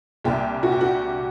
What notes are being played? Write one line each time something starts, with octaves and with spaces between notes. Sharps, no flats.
C2 A#2 G3 G4
F#4
G4
F#4